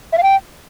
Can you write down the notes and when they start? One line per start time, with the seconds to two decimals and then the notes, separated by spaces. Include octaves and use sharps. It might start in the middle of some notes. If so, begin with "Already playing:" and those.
0.13 E5
0.18 F5
0.23 G5